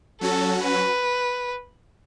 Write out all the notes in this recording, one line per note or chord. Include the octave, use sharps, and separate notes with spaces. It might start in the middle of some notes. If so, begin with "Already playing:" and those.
F#3 C#4 F#4 A4
B4